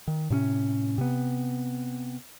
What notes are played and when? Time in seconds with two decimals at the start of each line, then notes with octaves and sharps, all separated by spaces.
0.08 D#3
0.30 A2 C3 C4 C#4
0.98 C3 B3